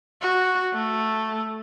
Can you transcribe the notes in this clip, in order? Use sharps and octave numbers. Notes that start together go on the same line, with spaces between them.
F#4
A3